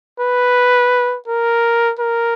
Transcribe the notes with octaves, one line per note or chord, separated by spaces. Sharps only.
B4
A#4
A#4